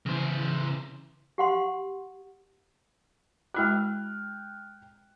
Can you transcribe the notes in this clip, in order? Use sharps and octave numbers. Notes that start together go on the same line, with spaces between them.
C#3 E3 C5
G4 F#5 C6
G#3 E4 F#4 G5 F6 F#6